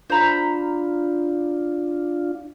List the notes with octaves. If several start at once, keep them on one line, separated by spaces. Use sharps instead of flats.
D4 F4 C5 A#5 B5